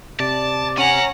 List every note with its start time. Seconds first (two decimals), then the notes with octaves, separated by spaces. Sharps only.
0.20 C3 D5 A5
0.78 C#4 F#5 G#5 A#5